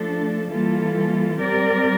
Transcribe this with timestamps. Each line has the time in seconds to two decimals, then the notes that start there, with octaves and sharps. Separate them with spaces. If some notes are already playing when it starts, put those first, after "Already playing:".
Already playing: F3 A3 D4 A4
0.51 E3 G3 A#3 F4 A4
1.38 G3 C4 G4 A#4 D5